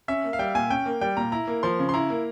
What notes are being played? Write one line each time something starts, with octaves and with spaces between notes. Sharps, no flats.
C#4 E5
A#3
F5
G3 G5
A#2 G#5
C#4 G5
A#3
G3 G5
A#2 A#5
E4 A#5
A#3
F3 C6
C#3
C6
E4 A#5
A#3